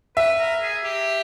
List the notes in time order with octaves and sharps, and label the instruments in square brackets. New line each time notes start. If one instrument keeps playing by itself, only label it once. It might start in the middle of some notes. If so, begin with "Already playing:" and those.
[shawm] B4 [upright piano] E5
[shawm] A#4
G#4
G4